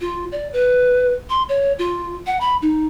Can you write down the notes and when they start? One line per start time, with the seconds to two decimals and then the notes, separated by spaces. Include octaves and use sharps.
0.01 F4
0.32 D5
0.53 B4
1.30 C6
1.49 C#5
1.79 F4
2.27 F#5
2.41 B5
2.62 D#4